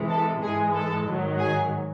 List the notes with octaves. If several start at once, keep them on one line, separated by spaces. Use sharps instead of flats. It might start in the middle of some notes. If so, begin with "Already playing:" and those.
Already playing: C3 E3 G#3
A4 A5
G#2 E3 G#3 G#4 G#5
A4 A5
G#2 D#3 F#3
G#4 G#5